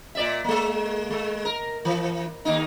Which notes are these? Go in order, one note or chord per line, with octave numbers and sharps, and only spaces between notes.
A#2 D5 E5
G#3 A#3
G#3
A#4
E3
D#2 A#3 D#4